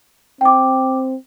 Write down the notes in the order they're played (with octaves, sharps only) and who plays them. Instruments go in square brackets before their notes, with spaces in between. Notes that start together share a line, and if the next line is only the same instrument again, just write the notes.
[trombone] C4 [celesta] G5 D6